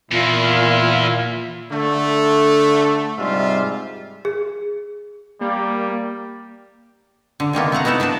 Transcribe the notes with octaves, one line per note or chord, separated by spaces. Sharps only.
E2 A#2 E4 F4
D3 A3
G#2 C3 G3 F4 E5
G#4
G3 A#3
D3
C3 D#3 A#3 B3
A3 F5 F#5 A#5
B3 D#4 E4 F#5 A5
B3 D4 F#4 A5